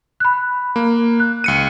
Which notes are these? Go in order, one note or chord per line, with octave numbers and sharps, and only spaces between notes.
B5 F#6
A#3
F#6
C#2 C#7 D#7